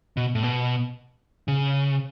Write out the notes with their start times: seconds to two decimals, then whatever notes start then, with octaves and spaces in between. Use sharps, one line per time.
0.17 B2
0.35 A2
0.43 B2
1.48 C#3